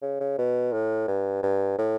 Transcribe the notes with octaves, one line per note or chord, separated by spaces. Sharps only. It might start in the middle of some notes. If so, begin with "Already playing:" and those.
C#3
C#3
B2
A2
G2
G2
A2